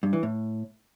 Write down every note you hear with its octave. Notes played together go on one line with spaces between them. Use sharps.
G2
E3
A2